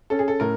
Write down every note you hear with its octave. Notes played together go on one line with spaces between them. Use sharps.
C#4 A4
G#4
A4
A2 A#4